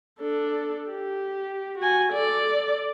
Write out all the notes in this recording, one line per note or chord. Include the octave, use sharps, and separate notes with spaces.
D4 A4
G4
F#4 G#5
A4 D5